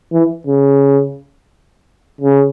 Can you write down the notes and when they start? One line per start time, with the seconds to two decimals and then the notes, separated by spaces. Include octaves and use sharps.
0.13 E3
0.47 C#3
2.21 C#3